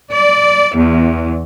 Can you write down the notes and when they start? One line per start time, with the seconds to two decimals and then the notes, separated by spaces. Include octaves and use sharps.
0.11 D5
0.75 E2